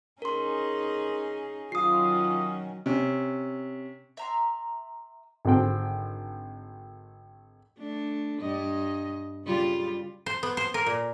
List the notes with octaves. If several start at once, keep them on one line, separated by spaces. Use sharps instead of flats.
C#4 D#4 G#4 A#4 C6
D#3 F#3 C#4 F4 D#6 C7
C3 C#4
E5 A#5 C6
G#1 D3 C4 G5
A3 D4
G2 D#5
C#3 G3 F4
C5
B3
C5
A#4
A#2